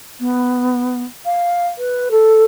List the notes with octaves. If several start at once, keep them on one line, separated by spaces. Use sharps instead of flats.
B3
F5
B4
A4